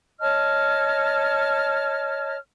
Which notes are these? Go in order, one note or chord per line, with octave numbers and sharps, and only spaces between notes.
C#5 D#5 A5 F6